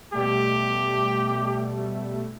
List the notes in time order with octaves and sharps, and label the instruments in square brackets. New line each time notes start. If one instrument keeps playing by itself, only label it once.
[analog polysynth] B2 G3 A3 [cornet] G4